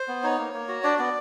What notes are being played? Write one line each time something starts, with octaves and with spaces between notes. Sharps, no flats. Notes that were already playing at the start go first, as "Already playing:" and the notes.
Already playing: C5
B3
D#4 C#5
A#3
A#3
F#4
D4 D5
B3 D5